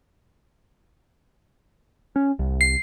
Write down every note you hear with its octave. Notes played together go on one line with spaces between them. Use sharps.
C#4
C2
C7